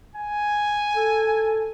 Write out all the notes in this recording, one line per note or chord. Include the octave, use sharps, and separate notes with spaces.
G#5
A4